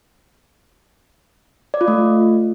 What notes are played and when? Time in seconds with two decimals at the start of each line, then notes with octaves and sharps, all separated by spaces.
1.74 D5
1.81 F4
1.88 A3